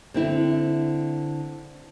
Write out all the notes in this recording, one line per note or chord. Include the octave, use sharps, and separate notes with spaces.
D3 C4 E4